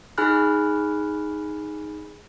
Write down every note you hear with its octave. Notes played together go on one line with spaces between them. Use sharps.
D#4 G#4 G#5 B5 F6 F#6